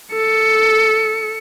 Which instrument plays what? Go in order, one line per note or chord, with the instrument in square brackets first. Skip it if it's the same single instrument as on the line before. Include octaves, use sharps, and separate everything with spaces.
[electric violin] A4 C#7